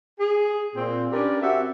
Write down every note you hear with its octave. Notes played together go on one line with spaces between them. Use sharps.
G#4
A#2 C4
C#4 D4 G4 A#4 B4 D5
C4 F#4 G4 E5